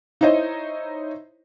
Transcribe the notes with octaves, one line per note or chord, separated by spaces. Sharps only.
D#4 E4 C5 C#5 D#5